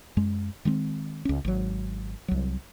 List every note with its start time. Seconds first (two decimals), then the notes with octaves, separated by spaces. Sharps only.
0.17 F#2 G#3
0.65 D#3 G#3 B3 C4
1.25 C#2 C#4
1.45 G#1 F#3
2.28 C2 F#3